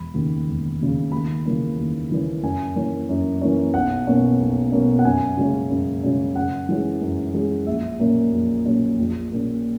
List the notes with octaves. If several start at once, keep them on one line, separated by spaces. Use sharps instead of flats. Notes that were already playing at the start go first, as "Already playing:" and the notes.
Already playing: E1 B5
D#2 C#3
E1
D#2 C#3
D#2 B5
C#3 E3 A#3 C#4
D#2
C#3 E3 A#3 C#4
F#2 G#5
E3 A#3 C#4
F#2
E3 A#3 C#4
B1 F#5
B2 A#3 C#4
B1
B2 A#3 C#4
F#5
F#2 G#5
C#3 G#3 C#4
F#2
C#3 G#3 C#4
F#2 F#5
E3 G#3 C#4
F#2
E3 G#3 C#4
A#1 E5
A#2 F#3 A#3 C#4
A#1
A#2 F#3 A#3 C#4
A#1
A#2 A#3 C#4